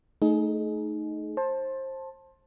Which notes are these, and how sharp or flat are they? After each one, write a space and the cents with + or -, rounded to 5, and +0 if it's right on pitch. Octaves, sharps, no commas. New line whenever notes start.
A3 +0 D#4 +0 G#4 +30
C5 +25 A5 +0